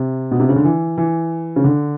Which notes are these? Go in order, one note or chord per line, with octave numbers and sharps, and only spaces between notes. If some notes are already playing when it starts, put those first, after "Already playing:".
Already playing: C3
B2
C3
C#3
D3
E3
E3
C#3
D3